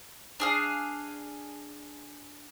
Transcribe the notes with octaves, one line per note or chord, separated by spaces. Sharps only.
D4 G#4 F5